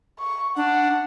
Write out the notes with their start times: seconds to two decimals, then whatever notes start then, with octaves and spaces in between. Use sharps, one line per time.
0.20 C#6
0.56 D4 F#5